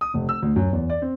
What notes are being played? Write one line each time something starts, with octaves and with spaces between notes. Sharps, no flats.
D#6
F1
E6
D2
F#2
E2
D5
C4